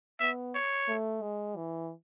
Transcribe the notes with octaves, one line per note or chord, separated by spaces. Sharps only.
B3 E5
C#5
A3
G#3
E3